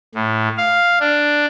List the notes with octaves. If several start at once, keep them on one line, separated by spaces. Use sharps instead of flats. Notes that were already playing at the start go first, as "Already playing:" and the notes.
A2
F5
D4